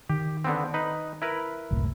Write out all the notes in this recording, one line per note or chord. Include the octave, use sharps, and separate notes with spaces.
D#3 G4
D3 B3 C4
D#4 B4
E4 A#4 B4
F#1 C2 A2